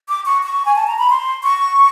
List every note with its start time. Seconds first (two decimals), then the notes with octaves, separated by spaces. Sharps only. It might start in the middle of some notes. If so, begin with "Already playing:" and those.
0.09 D6
0.26 C#6
0.43 C#6
0.65 G#5
0.76 A5
0.87 A#5
0.99 B5
1.10 C6
1.43 C#6